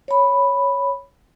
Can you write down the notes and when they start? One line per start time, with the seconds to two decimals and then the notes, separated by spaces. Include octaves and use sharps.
0.08 C#5 B5